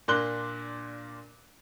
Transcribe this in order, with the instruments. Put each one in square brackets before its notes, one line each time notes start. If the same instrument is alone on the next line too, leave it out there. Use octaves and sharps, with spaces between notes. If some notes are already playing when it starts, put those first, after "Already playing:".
[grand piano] A#2 A#3 D4 C6 F#6 G7